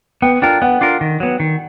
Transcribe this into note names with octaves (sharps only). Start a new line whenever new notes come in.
B3 G5
D4 F4 A#4 G5
B3 F#5
D4 F4 A#4
D#3
F#3 B3
D#3